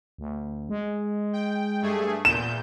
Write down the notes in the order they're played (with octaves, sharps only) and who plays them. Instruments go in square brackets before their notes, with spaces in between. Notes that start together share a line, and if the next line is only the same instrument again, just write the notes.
[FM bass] D2
G#3
[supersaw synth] G5
G2 A3 G#4
[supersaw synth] E2 A#2 G6 [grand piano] E7